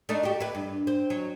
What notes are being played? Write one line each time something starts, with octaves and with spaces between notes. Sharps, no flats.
A3 D4 D#4
F#4 G4
E4 B4
G2
C4
F#3